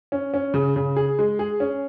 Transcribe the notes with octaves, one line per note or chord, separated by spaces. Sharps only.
C#4
C#4
C#3
C#3
G#4
G#3
G#4
C#4